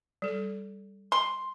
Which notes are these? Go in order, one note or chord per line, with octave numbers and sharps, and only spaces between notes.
G3 A4
C6